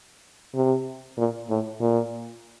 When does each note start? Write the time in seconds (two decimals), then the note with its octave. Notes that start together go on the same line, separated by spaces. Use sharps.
0.55 C3
1.18 A#2
1.49 A2
1.81 A#2